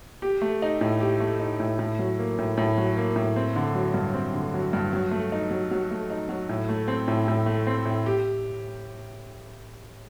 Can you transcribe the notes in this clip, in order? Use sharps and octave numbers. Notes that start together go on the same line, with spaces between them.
G4
A3
D#4
A2
G4
A3
D#4
A2
A2
F#3
A#3
A2
A2
F#3
A#3
A2
C4
D3
F#3
G2
C4
D3
F#3
G2
F#3
A3
D#4
F#3
F#3
A3
D#4
F#3
A2
A3
C4
A2
A2
A3
C4
A2
G4